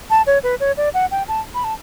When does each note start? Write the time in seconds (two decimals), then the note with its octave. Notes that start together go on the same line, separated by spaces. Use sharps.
0.10 A5
0.27 C#5
0.43 B4
0.60 C#5
0.77 D5
0.94 F#5
1.11 G5
1.28 A5
1.55 B5
1.64 A5